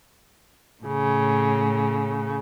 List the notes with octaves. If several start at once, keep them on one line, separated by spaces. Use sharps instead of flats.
A2 C#3